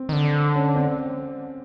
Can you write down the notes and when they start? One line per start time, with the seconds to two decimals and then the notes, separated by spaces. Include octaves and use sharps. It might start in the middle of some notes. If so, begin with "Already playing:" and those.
Already playing: C4
0.09 D#3
0.13 D3
0.55 C#4
0.76 C4